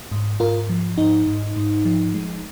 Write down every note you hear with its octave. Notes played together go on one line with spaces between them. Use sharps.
G#2
G#2 F4 A#4
F3
G#2 D#4
G#2
G#2
F3
G#3